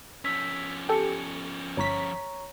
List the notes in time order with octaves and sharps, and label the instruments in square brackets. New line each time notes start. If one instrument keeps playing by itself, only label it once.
[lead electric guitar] F3 C#4 [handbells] E6 B6
[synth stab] G4 A4 [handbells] G#5 C#7
[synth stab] G1 B6 [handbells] C#5 A#5 C#6